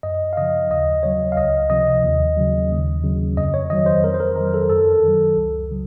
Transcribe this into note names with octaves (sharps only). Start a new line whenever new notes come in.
F#2 D#5
F5
C#3 F3 D#5
D#2 D#5
C#3 F#3 C#5
F5
C#2 D#5
C3 F3 D#5
D#2
C#3 F#3
D#2
C#3 F#3
F2 D#5
C#5
D#3 F#3 D#5
C5
F2 A#4
C5
A#4
D#3 F#3 A#4
A4
F#2 A4
D#3 F#3
C#2
C#3 F#3